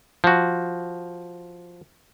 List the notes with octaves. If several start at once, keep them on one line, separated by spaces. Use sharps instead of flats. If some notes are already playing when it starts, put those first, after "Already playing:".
F3 F#4